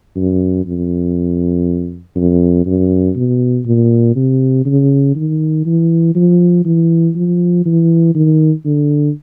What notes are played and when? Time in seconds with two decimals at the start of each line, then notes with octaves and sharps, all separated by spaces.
0.16 F#2
0.66 F2
2.16 F2
2.66 F#2
3.15 B2
3.66 A#2
4.16 C3
4.65 C#3
5.16 D#3
5.66 E3
6.15 F3
6.65 E3
7.15 F3
7.66 E3
8.15 D#3
8.65 D3